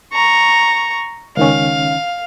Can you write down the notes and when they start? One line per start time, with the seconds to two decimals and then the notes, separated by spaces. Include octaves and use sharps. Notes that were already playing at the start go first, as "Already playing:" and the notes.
0.13 A#5 C#6
1.37 C#2 D#3 C#4 F5